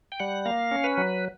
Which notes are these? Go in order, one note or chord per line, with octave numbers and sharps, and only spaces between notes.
G5
G3 F#5
A#3 F5
C#4
B4
F#3